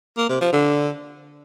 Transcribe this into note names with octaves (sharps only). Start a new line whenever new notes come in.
A#3
C3
F3
D3